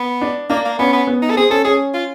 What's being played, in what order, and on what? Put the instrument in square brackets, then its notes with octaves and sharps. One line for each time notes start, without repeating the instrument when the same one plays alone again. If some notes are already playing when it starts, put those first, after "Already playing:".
Already playing: [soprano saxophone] B3
[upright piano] D4
[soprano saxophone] A#3 [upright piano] D4
[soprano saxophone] A#3
[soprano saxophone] B3 [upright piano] C#4
[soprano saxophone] B3
[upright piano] B3
[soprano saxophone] D#4
A4
[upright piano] C4 [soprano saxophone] G#4
[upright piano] C#4 [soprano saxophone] A4
[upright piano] C#4 [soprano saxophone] G#4
[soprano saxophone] F4